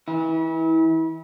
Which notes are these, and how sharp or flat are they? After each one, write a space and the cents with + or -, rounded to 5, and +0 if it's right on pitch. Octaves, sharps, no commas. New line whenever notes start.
E3 -25 E4 -35